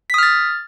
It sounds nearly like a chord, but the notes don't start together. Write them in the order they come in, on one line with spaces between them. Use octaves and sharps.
B6 D#6 F6 A6